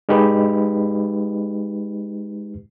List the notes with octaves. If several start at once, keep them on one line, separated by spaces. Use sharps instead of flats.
G#3 D#4 G4 B4